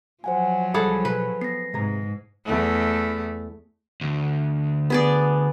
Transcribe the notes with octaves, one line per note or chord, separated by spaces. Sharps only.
F3 F#3 C5 F#5 G#5
C2 G3 G#4 A4 F#5 B5 C#6
B2 B4
B3 A#6 C7
G#2 C3 G#4 A#5
E2 A3
D2
B3 G#4 D5